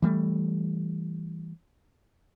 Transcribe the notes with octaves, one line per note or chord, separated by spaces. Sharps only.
E3 G3 A3